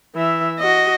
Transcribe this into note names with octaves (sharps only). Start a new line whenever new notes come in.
E3 E5
F#4 D#5